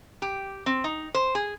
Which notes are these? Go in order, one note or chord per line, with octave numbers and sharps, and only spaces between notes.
G4
C4
D#4
C5
G#4